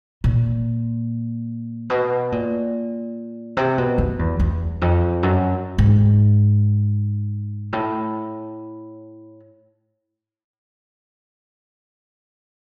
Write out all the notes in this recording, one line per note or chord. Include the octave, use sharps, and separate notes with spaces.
A#2
B2
A#2
C3
B2
F#2
E2
E2
F2
F#2
G#2
A2